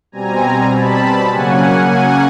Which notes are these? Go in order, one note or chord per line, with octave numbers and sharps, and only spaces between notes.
B2 G3 C4 G#5 A#5
A5 B5
C#3 F#3 A#3 C#4 F#5 G#5
F#5 G#5